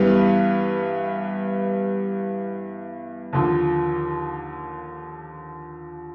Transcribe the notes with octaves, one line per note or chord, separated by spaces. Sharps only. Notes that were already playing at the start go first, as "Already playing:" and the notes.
Already playing: G2 E3 G3 B3
D#2 D3 F3